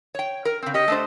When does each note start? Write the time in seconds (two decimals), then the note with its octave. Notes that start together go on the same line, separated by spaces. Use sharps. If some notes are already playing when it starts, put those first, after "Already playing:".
0.15 C#5 G5
0.45 A#4
0.62 C#3 C4
0.74 C#4 G4 D#5
0.88 A3 D4 C5